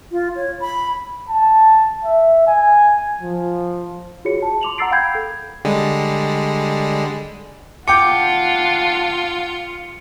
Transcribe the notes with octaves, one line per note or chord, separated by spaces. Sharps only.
F4
C#5
B5
A5
E5
G#5
F3
F4 F#4 G#4 C#5 C#7
A5
C6 D6 F7 F#7
F#5 A#5 E6 A6 C7 D7
F5 G5 B5 G6 G#6 C7
A4
D3 G3 G#3
F4 F#5 G5 A5 D6 C#7